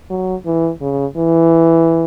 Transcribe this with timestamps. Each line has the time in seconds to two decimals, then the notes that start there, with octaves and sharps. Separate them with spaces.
0.10 F#3
0.46 E3
0.81 C#3
1.17 E3